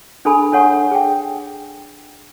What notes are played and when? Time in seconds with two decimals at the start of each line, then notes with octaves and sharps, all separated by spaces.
0.25 D4 G#4 A4 G#5 B5
0.52 D4 A4 C#5 F#5 G#5 C#6
0.91 G#4 G5